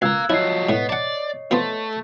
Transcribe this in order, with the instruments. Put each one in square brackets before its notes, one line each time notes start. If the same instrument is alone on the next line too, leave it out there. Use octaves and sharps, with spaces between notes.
[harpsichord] C#2 [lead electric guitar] F5 A#5 [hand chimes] E6 F#6 G#6
[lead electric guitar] F3 F#3 [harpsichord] E4 [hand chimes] C#5 D#5 C7
[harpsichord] A2 A3 [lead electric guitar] B3
[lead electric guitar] D5 [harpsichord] F#5 A5
[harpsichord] F3 B3 C6 [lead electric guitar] A3